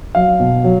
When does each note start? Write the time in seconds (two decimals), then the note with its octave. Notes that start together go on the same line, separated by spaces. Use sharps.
0.15 F#3 F5
0.40 B2
0.64 F#3